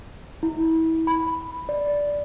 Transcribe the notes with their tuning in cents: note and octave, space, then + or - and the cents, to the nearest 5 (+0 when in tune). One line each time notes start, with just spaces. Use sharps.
E4 -30
B5 +0
D5 -5